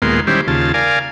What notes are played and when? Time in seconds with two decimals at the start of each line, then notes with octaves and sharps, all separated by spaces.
0.02 D#2 A#2 G#3 A#3 B3 C6
0.27 D#3 G3 C#4 E4 G4 C5
0.48 D#2 C#3 F4 A5
0.74 A#4 D5 F5 G#5